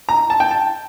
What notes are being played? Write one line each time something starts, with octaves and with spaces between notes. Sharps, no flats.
A#5
A5
G5
A5